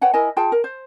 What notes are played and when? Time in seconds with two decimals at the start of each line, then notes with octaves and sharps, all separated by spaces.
0.01 B4 C#5 F#5 G5
0.14 E4 A#4 D#5 G#5
0.37 F4 G#4 G5 A5
0.52 A#4
0.64 C5